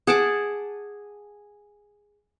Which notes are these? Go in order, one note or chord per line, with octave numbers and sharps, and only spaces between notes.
G#4 F#5 A5 D6